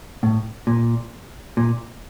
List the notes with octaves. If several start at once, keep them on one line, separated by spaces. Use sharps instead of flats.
A2
A#2
A#2